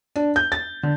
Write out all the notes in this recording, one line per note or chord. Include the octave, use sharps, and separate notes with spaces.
D4
G6
A6
D3